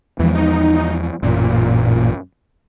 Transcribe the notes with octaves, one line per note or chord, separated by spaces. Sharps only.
E2 E3 F3 G#3
D#4
A1 F#2 A#2